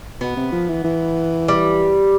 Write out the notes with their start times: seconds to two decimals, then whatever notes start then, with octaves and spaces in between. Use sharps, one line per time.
0.20 B2 B3
0.37 C3
0.52 F3
0.69 E3
0.84 E3
1.48 G3